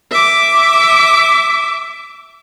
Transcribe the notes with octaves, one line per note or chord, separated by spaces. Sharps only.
E5 D6